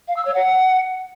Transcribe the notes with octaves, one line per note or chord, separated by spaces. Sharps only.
F5
E6
C#5
F#5